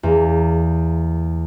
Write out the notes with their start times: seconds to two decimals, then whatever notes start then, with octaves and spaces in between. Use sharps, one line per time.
0.03 E2 A#3